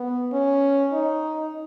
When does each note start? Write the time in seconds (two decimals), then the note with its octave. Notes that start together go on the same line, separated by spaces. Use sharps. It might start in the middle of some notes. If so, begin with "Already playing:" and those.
Already playing: B3
0.32 C#4
0.93 D#4